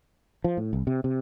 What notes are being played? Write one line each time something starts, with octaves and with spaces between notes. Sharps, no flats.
F3
A2
C2
C3
C3